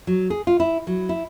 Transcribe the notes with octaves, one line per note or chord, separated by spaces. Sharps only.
F#3
G#4
F4
E4
F#3
E4